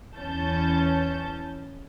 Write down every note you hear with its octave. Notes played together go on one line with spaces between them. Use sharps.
E2 E3 C#4 A5 G6